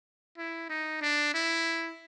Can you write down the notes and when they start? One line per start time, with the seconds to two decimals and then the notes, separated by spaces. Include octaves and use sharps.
0.38 E4
0.69 D#4
1.02 D4
1.34 E4